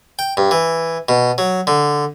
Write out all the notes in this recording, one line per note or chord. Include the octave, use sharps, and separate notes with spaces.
G5
G2
E3
B2
F#3
D3